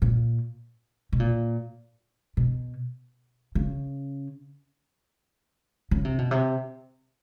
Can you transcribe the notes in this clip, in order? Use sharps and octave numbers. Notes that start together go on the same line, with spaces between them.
A#2
B2
A#2
B2
C#3
C#3
C3
B2
C3